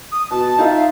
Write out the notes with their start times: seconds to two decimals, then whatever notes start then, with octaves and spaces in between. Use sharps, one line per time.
0.12 D#6
0.31 B2 A5
0.58 D#4 F4 E5
0.76 F5